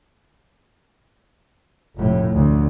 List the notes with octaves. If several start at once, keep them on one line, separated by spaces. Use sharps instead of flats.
F1 A2
D2